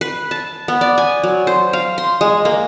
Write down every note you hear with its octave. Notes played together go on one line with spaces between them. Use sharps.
B4
A5
B3
D5
G#5
F#3
C5
F5
C6
G#3
A#3